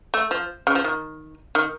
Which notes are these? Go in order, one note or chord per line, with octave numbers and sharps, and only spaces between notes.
A3
F3
C#3
F3
D#3
D#3